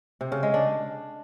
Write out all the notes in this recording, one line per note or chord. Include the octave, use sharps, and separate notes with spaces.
C3
C#3
G#3
D4